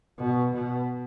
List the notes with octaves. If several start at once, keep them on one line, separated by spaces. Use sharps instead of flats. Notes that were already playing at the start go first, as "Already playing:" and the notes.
B2
B2